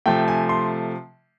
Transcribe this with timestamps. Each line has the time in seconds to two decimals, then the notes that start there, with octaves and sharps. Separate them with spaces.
0.06 C3 F3 A3 G5
0.28 G#5
0.49 C6